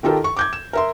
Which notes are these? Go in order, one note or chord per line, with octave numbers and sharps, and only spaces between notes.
D#3 F4 G4 A4 A#4
C#6
D6 G6 G#6
E7
A#4 E5 C6